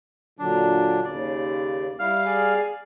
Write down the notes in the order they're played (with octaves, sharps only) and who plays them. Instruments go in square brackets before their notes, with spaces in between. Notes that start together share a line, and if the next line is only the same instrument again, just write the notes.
[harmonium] A#2 D3 F#3 [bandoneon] D4
[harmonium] D#2 C#3 [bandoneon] D5
[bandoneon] G3 F5 F6 [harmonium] E4
[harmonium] G#4 D5 G#5